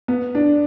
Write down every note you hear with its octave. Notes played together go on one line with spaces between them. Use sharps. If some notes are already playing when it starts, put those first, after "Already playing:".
B3
D4